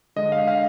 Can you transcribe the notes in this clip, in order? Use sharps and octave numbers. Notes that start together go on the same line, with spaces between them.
D3 G#3 D#5
F5
F5